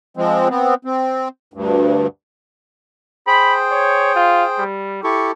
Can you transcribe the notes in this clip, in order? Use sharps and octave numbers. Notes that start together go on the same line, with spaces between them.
F3 G#3 C4
B3 C4
C4
D2 G2
G#4 C5 G5 B5
C#5
F4
G3
E4 G4 A4 C#6